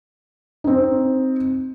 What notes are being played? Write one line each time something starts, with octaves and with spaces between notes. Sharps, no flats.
C4 D#4